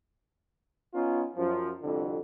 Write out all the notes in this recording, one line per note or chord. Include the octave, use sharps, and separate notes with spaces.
B3 C#4 D#4 F4
F#2 F3
C2 F2 D3